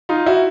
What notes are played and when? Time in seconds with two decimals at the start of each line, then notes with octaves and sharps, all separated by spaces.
0.09 D#4 F4
0.26 E4 F#4